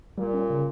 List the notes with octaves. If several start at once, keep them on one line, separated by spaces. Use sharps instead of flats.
A#2 G3
C#4
C#3